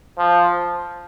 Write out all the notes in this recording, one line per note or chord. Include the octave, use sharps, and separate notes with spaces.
F3